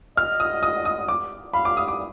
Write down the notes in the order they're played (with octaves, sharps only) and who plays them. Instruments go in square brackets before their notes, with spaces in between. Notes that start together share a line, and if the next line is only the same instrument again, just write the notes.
[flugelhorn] D#5 [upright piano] F6
[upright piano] D#6
D#6
D#6
D6
[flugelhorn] F5 [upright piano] B5
[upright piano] D6
D#6
D6